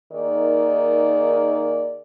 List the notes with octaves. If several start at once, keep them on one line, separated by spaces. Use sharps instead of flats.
D#3 A#3 D#4 G#4 D5